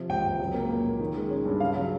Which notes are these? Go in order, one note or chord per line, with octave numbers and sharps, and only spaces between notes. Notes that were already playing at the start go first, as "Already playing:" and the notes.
Already playing: C3 F3
C#2 G5
C#2
F#3
A#3
A#2
A#2
D#3
G#3
C#4
G2
C#3 F5
F#3